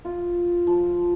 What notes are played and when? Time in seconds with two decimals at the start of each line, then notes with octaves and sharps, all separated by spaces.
0.05 F4
0.67 F3